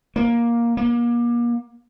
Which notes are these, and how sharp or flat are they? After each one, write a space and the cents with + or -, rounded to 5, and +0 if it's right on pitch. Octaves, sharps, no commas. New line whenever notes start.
A#3 +10
A#3 +35